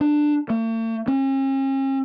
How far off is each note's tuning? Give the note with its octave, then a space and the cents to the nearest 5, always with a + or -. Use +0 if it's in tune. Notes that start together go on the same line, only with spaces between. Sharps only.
D4 +15
A3 +45
C#4 -45